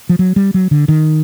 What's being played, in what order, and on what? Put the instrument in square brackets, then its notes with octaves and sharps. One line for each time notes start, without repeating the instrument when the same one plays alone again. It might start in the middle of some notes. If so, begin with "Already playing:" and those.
[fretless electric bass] F3
F#3
G3
F#3
D3
D#3